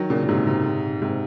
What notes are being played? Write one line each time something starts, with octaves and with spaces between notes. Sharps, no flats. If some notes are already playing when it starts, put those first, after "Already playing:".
Already playing: D#3 F#3
A#2 C#3
A#2
G#2 C3
G#2 C3
G#2 C3